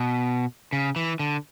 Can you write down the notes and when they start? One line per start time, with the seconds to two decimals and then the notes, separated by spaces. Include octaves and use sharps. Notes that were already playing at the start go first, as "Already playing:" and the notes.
Already playing: B2
0.73 C#3
0.96 E3
1.19 D3